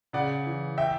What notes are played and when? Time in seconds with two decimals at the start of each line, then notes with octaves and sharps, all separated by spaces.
0.13 C#3 D5 F#5
0.46 E3
0.78 E5 G5